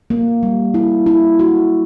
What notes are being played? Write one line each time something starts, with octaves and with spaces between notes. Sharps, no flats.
A#3
G3
E4
E4
F#4